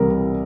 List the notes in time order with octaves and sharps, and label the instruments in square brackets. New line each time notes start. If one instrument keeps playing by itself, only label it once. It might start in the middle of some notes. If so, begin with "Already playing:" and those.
Already playing: [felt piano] C2 C3 E3 G3 A#4